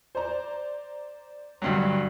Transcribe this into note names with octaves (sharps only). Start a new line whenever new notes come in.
C5 D5 A#5
D2 G2 F#3